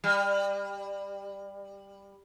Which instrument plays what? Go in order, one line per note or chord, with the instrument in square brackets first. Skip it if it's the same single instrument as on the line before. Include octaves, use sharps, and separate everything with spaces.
[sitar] G3